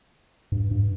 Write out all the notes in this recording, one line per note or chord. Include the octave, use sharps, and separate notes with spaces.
G2
G2